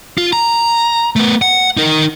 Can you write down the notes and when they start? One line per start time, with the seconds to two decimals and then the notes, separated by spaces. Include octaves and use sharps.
0.18 F4
0.33 A#5
1.16 A3 B3
1.42 F#5
1.77 D#4 A#4